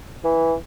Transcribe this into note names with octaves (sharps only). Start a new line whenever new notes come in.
E3